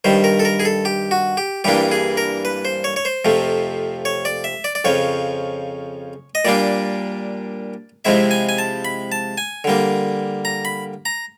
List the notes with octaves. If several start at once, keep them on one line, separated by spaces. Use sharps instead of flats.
G2 D#3 G3 C5
A#4
A4
A#4
G#4
A4
G4
F#4
G4
G2 E3 G3 A#3 D4 G4
G#4
A#4
B4
C5
C#5
C#5
C5
F2 C3 F3 A3
C#5
D5
E5
D5
D5
F2 C#3 F3 C#5
D#5
A#2 G3 A#3 D4 D5
C3 F3 G#3 C4 E4 E5
G#5
G#5
A5
B5
A5
G#5
D3 G3 A#3
A#5
B5
A#5